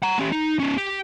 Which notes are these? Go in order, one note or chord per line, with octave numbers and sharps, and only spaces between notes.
F#5 A#5
C#4 G4
D#4
C#4 D#4
G4